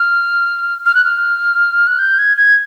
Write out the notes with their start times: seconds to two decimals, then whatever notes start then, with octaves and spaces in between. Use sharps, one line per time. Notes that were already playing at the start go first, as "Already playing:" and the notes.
Already playing: F6
0.86 F6
0.95 F#6
1.04 F6
1.87 F#6
1.99 G6
2.19 G#6
2.37 G#6